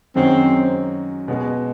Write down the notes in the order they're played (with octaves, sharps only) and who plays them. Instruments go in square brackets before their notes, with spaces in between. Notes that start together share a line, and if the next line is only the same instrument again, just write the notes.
[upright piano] F#2 D#3 G#3 C#4 F#4 [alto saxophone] C4
[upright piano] B2 G#3 B3